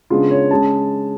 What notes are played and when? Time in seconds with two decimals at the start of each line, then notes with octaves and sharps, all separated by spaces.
0.10 C#3 G#3 B3 D4 F4
0.31 C#5
0.51 C#3 G#3 C#4 A5